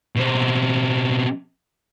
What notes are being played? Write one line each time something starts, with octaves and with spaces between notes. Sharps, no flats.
B2 C4